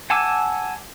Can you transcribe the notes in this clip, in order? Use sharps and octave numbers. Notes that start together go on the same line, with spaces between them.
F#5 G#5 A5 D6 E6